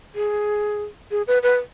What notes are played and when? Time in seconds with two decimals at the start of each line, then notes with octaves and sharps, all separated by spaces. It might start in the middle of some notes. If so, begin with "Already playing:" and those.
0.15 G#4
1.11 G#4
1.27 B4
1.43 B4